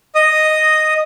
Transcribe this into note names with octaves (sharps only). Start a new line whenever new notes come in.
D#5 D#6